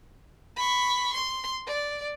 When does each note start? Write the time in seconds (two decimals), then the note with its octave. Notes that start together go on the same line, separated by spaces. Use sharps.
0.56 B5 C#6
1.13 C6
1.67 D5